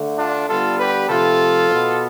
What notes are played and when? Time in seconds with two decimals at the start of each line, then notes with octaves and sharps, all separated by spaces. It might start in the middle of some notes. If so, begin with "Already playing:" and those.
Already playing: D3 A3
0.19 D4 F4
0.49 D3 G3 B3 F4 A4
0.79 G4 B4
1.09 C3 F3 A3 F4 A4
1.69 B2 B3